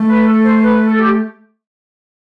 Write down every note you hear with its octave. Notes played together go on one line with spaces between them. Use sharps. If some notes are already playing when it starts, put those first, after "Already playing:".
Already playing: A3
B4
A4
C5
B4
A4
G4